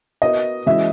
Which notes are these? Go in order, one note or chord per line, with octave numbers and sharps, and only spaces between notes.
B3 F#4 A#4 D#5 E5
E3 G#3 C#4 F#4 E5